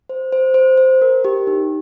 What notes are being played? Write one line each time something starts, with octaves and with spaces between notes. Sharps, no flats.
C5
C5
C5
C5
A#4
G4
D#4